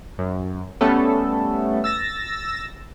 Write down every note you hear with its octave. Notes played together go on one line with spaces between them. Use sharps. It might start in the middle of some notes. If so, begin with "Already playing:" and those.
F#2
G3 A3 B3 C#4 A4
E6 A6 A#6